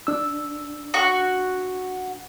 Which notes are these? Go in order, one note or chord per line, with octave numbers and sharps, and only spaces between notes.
D4 E6
F#4 C#6